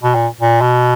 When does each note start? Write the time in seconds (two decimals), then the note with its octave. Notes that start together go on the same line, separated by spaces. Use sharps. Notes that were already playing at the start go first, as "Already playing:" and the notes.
0.03 B2
0.15 A#2
0.41 A#2
0.61 B2